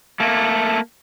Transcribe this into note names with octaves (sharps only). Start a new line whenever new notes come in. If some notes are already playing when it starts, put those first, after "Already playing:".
A3 A#3